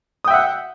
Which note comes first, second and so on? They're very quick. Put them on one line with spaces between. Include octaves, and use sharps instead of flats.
D#6 G5 E5 F#5